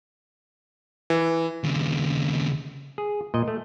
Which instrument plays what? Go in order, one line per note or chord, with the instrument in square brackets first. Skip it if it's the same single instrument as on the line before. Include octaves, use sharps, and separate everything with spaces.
[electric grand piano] E3
[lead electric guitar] D#2 C#3
[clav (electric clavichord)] G#4
A#2 D#5
A3